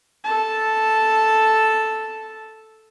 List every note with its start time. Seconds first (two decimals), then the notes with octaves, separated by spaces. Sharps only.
0.24 A4 A5